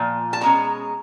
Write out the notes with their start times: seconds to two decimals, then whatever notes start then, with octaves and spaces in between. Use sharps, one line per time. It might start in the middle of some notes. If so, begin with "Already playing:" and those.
Already playing: A#2 F3
0.33 A5
0.41 B2 G#3 C#4 A#5